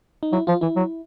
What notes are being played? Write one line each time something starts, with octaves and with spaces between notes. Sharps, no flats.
D#4
F#3 E4
F3 F4
E3 E4
F#3